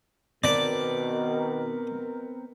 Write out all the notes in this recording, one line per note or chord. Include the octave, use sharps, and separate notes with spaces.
B2 D#3 B3 C4 A#4 D5 A5